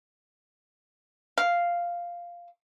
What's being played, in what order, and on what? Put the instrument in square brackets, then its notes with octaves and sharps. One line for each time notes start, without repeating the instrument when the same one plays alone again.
[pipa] F5